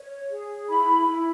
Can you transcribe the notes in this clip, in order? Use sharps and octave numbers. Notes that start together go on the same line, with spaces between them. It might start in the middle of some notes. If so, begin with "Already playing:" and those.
Already playing: C#5
G#4
E4 B5
E4